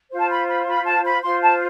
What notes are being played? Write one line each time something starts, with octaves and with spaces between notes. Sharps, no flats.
F4 C5
A5
B5
B5
B5
A5
B5
F4 C5 C6
A5